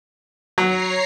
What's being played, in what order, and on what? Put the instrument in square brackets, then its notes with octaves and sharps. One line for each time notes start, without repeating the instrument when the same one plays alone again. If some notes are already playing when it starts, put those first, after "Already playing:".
[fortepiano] F#3 [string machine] C#5 A#5 C7